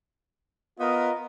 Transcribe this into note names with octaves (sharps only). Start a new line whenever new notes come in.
B3 F4 A#4 D#5